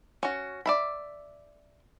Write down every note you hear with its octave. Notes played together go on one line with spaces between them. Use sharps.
C#4 F#4
D5 E5 B5